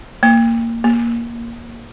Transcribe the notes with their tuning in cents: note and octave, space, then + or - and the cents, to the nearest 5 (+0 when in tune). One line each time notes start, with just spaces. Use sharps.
A#3 -15
A#3 +10